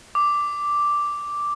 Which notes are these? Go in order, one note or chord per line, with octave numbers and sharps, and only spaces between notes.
D6